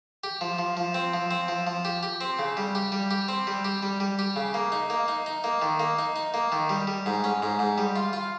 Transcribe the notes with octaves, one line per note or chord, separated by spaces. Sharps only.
G4
F3
F3
F3
C4
F3
C4
F3
F3
G4
G4
C4
C#3
G3
G4
G3
G4
C4
G3
G4
G3
G3
G4
C#3
A#3
D#4
A#3
D#4
D#4
A#3
D#3
A#3
D#4
D#4
A#3
D#3
G3
G3
G#2
C#4
G#2
G#2
G3
F4
F4